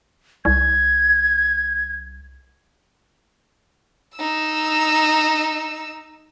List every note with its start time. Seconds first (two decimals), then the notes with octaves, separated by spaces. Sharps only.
0.45 C2 G#6
4.16 D#4 E6